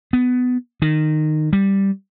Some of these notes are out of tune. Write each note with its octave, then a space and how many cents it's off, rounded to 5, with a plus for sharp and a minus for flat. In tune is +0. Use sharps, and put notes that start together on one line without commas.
B3 +15
D#3 -15
G3 +0